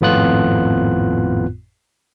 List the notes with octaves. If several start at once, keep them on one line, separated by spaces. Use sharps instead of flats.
G#1 F2 A2 B3 F4 F#6